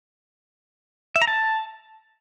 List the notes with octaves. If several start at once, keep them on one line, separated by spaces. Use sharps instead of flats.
E5
A#5
A5